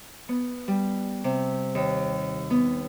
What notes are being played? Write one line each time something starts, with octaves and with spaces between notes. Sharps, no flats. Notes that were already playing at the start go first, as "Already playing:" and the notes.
B3
G3
C3
D#2
B3